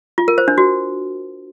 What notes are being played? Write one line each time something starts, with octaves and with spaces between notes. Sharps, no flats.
F4
A#4
C5
D4
F#4